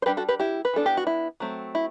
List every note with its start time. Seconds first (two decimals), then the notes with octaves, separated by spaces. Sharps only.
0.02 C5
0.06 G3 D4 G4 B4
0.17 F#4 A4
0.29 G4 B4
0.40 E4 G4
0.65 B4
0.74 E3 B3 D4 A4
0.86 G4
0.97 F#4
1.07 E4
1.40 F#3 A3 C4
1.75 E4